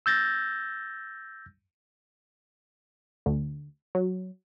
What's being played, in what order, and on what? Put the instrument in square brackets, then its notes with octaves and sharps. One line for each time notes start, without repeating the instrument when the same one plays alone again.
[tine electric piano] E6 G6 A6 A#6
[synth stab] D2
F#3